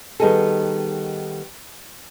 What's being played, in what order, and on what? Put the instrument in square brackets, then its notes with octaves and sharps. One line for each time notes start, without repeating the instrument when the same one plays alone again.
[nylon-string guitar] D#3 G3 B3 D#4 G#4 A4